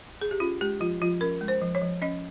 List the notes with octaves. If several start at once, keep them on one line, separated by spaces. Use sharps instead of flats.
G#4
G4
C#4 F4
G#3 G4
F3 F4
F3 F4
C#4 A#4
G#3
C5
F3
C#5
F3
C#4 D#5